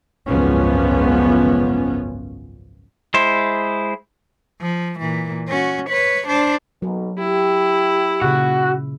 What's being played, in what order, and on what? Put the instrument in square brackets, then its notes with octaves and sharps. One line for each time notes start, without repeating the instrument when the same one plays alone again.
[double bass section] G#1 C#2 F#2 F3 B3 C#4
[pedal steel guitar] G#3 E4 C5
[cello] F3
A#2 E3
C#4 F#4
B4 C#5
D4 C5
[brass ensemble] B1 [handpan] F#3 A#4
[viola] E4 [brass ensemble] G4
[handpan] A#2 C#3 [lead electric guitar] F#4